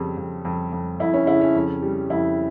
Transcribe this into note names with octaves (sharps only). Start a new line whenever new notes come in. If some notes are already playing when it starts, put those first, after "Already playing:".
Already playing: F2 C#3 G3
F2
F2
F2
F2 E4
C#4
C#3 E4
C#4
F2
G3
F2 E4